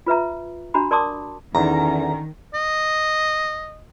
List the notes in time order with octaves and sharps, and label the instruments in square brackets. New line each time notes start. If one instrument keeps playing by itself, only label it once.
[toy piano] F4 B4 E5 A#5
D4 F#4 A#5 B5
A#4 D5 A5 C6 D6 D#6
[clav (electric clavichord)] E2 [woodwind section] D3 C#4 [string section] D#3 [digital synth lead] A#5
[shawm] D#5